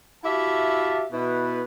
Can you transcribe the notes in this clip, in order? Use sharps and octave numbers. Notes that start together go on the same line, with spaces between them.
E4 F#4 G4 E5 F5 A5
B2 E4 B4